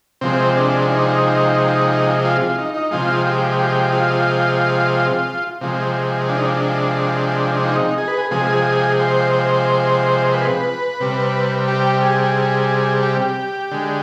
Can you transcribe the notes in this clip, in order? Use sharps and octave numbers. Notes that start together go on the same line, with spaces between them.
C3 F3 G#3 C4
D4
D#4
F4
F4
D#4
D#4
C3 F3 G#3 F4
G4
G4
F4
C3 F3 G#3
D4
D#4
D4
D#4
G#4
B4
G#4
C3 F3 G#3 G#4
C5
C5
B4
C3 G3
G4
G#4
G4
D3 G#3